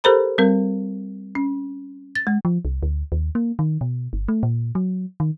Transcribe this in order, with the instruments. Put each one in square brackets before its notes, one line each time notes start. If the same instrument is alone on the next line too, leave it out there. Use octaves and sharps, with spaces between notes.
[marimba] G4 A4 A#4 C5 A#5 B5
G3 C4 A#4
C#4
A6
G#3
[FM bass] F3
C2
D2
D#2
A#3
D#3
B2
G1
A3
A#2
F#3
D#3